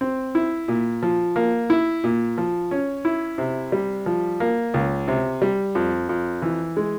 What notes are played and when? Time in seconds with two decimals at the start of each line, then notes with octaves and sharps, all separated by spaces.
0.01 C4
0.35 E4
0.68 A#2
1.03 F3
1.36 A#3
1.70 E4
2.04 A#2
2.38 F3
2.71 C#4
3.05 E4
3.38 C3
3.72 G3
4.06 F3
4.40 A#3
4.74 C#2
5.08 C3
5.42 G3
5.75 F2
6.09 F2
6.42 E3
6.77 G#3